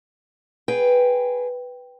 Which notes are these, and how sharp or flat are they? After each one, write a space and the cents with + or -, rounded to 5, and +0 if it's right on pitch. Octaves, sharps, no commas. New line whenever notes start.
G#4 +0 B4 +0 G5 +0